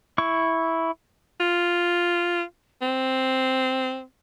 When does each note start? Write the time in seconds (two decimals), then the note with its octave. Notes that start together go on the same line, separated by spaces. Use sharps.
0.18 E4 C#6
1.40 F4
2.82 C4